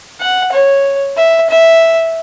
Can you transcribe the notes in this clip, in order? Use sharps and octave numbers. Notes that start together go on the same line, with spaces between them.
F#5
C#5
E5
E5